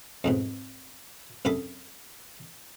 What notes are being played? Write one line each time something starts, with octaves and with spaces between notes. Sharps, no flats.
F2 G#2 B2
C2 F#2 A4 B5 D#6